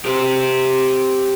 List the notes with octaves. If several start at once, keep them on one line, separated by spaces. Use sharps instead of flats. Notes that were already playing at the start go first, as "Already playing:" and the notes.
G4 C5